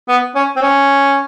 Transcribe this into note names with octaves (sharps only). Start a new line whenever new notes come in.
B3
C#4
C4
C#4